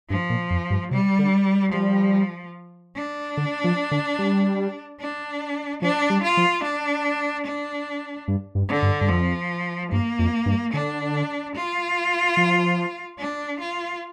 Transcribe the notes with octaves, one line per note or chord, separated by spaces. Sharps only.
G2 F3
A#2
F2
G2
C3 G3
D3
F3 G3
D4
D3
F3
D3
G3
D4
F3 D4
G3
F4
F3
D4
D4
G2
G2
D3
G2
G2
F2 F3
G2 A#3
F2
G2
D3 D4
F4
F3
D4
F4